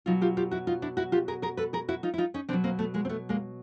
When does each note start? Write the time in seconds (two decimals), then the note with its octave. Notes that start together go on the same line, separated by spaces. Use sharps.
0.06 B2 F#3 D#4 F4
0.21 F4 G4
0.37 F4 G4
0.51 E4 F#4
0.67 D#4 F4
0.82 D4 E4
0.97 E4 F#4
1.12 F4 G4
1.28 G#4 A#4
1.42 G#4 A#4
1.57 A4 B4
1.73 G#4 A#4
1.88 E4 F#4
2.03 D#4 F4
2.14 E4
2.18 D#4 F4
2.34 C#4 D#4
2.49 B2 C4 D4
2.53 F#3
2.64 A#3 C4
2.79 A3 B3
2.94 G#3 A#3
3.05 C4
3.09 A3 B3
3.29 G#3 A#3